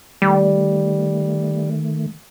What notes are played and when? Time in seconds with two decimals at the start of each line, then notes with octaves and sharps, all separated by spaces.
0.22 D#3 G3 A3